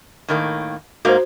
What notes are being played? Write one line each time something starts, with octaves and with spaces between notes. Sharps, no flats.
A2 D#3 A#3
G#2 A#3 F#4 C5